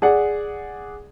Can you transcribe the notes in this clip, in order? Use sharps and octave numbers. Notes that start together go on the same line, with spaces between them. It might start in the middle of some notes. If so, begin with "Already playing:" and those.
G#4 D5 F#5